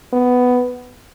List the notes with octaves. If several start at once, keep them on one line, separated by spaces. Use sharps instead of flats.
B3